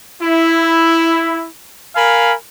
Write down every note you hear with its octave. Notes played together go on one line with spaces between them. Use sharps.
E4
A#4 F5 G#5 B5